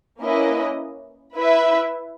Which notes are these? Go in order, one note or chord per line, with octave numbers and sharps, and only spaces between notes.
A#3 C#4 E4 B4 D#5
E4 B4 E5